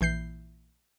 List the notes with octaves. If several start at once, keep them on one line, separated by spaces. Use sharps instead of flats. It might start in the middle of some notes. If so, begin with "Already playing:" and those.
A#1 E3 G6 C7